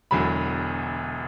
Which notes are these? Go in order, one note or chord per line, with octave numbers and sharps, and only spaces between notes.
E1 E2 D3 F#3 B5